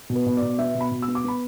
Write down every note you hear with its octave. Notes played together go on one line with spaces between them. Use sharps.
B2
B4
B2
D5
B2
B3 E5
B2
B5
B2
E6
B3
D6
B3 B5